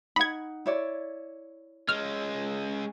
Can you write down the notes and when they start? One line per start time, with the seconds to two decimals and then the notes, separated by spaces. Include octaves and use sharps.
0.16 D#4 F#5 B5 G#6
0.66 E4 C#5 D5
1.89 G#3 C#4 F6